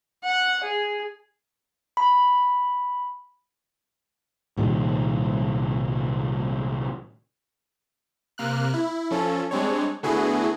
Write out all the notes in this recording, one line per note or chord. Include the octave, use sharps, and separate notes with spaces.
F#5
G#4
B5
C2 A#2 D#3 G3
C3 A#3 F6 F#6
E4
F3 C#4 A4
G3 G#3 C4 D4 C#5
D3 A3 B3 E4 F#4 G#4